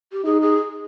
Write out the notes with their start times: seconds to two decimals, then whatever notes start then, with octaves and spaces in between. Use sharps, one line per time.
0.12 G4
0.24 D#4 G#4
0.42 G#4